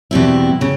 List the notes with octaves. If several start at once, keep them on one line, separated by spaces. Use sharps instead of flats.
E2 B2 G3 C4 E4
C#3